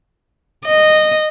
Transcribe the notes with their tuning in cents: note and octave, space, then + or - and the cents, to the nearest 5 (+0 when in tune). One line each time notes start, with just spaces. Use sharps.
D#5 -15